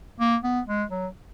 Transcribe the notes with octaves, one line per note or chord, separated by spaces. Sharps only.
A#3
B3
G#3
F#3